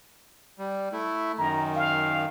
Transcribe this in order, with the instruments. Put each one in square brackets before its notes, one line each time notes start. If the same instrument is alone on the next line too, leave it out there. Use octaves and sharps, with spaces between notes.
[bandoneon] G3
A3 E4
[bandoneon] F#2 D#3 [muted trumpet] A#5
[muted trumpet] F5